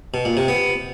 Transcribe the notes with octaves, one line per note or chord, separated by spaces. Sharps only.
B2
A#2
C3
B3